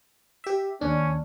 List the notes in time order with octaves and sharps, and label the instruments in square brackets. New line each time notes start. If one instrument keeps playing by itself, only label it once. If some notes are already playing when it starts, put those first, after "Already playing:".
[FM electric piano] G4 E5
[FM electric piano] D#2 D4 [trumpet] C#4